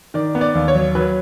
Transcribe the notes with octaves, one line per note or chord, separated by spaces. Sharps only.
D#3 D5
B3
D5
D#2
C#5
F#3
F#3 B4